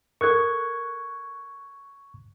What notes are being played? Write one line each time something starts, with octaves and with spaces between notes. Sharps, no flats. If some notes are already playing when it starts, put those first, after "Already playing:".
A4 A#4 C#6 F#6 G#6